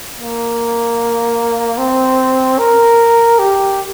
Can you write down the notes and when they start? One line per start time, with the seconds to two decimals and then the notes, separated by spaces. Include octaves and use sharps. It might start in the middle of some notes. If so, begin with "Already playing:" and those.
0.17 A#3
1.78 C4
2.59 A#4
3.39 G4